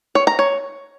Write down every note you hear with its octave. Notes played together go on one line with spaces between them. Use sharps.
C#5
A#5
C#5